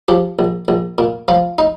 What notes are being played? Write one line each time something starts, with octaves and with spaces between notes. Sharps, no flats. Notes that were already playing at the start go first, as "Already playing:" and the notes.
F3 G4
A#1
A#1
A#2
F3 F4
D#4